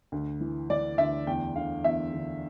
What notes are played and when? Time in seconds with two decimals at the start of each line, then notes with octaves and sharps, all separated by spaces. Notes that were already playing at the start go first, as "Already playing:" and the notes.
0.12 D2
0.41 E3
0.69 E3 D5
0.98 D2 E5
1.27 E2 G5
1.55 D3 F5
1.84 E2 E5
2.13 D3